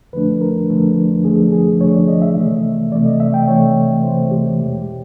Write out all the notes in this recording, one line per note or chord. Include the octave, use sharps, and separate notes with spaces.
F2 D3 F3 A3 D4 B4
A#4
F2 D3 F3 A3 D4
F2 D3 F3 A3 D4 G#4
G#4
F2 D3 F3 A3 D4 C#5
D5
D#5
E5
C3 E3 A3
C3 E3 A3 D5
D#5
E5
G5
C3 E3 A3 C#5
C3 E3 A3 C5
G4
E2 B2 G#3 G4